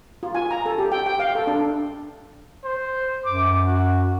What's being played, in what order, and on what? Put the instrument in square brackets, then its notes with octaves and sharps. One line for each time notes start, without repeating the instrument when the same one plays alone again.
[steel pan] F4
G#5
A#5
A4
G4
G5
G5
F5
A4
D4
[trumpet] C5
[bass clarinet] F#2 [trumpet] D6
[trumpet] F#4